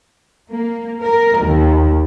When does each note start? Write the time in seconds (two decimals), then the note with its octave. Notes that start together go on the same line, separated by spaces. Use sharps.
0.50 A#3
1.00 A#4
1.40 D#2